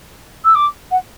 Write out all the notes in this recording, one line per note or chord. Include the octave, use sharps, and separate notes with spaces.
E6
D6
F#5